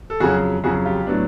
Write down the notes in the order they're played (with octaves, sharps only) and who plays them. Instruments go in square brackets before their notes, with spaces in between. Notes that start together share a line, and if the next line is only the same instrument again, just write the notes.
[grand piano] A4
F2 C#3 F#3 F#4 G#4
F2 C#3 F#3 F#4 G#4
F4 G4
A2 F#3 B3 D4